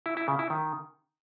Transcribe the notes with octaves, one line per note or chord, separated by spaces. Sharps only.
E4
E4
C#3
E4
D#3